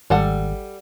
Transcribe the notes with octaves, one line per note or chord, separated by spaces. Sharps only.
G#1 G3 A4 F#5